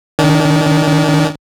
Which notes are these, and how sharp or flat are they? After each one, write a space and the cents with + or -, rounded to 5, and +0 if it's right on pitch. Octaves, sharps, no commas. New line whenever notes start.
D#3 +0 D4 -35